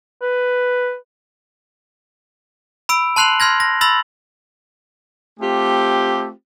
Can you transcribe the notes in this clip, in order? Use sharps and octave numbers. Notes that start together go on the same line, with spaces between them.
B4
B5 E6 D7
A5 C6 F#6 C7 F7 F#7
C6 F6 G#6 A#6
A#6
B5 E6 A6 F#7
A3 C4 F4 G4